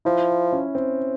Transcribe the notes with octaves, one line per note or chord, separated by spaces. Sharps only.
F3 E4
C#4
C4